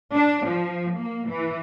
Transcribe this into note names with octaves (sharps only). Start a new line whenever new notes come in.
D4
F3
A#3
E3